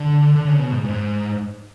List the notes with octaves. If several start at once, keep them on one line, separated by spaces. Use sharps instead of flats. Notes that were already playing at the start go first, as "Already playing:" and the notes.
Already playing: D3
D3
C#3
B2
G#2
G#2